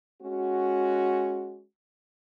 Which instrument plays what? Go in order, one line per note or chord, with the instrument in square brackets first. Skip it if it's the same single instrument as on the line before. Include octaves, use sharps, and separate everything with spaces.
[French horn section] G#3 C#4 F#4